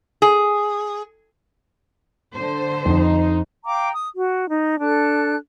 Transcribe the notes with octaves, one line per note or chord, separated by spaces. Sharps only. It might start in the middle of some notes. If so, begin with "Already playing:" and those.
G#4
D3 C5
F2 D#4
F5 G5 A#5 D6
D#6
F#4
D#4
D4 A4 F#6